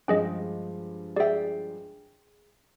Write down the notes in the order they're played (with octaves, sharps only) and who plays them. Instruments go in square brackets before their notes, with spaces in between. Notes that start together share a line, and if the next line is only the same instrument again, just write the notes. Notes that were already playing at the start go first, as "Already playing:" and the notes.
[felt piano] G2 F3 G#3 [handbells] C#4 G#4 D#5 [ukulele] G5
[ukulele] G#4 G5 [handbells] D5 E5